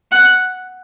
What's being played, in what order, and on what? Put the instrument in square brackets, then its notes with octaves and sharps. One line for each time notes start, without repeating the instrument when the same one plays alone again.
[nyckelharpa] F#5